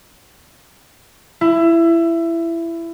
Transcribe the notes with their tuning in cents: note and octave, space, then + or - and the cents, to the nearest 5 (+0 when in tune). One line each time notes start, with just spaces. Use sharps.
E4 +20